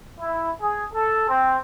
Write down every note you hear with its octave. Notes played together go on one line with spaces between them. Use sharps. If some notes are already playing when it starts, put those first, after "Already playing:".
E4
G#4
A4
C4